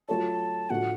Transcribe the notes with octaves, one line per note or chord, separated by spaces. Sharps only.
F#3 A3 F4 A4 C#5 A5
A2 F3 A3 D4 F#4 F#5